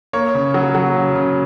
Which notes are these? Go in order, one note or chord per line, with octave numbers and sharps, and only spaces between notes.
A#3 C#5
C#3
F#3
F#3
C#3
C#3